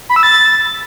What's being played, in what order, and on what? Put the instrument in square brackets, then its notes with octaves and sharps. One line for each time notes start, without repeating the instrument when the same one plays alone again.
[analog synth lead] B5
E6
A6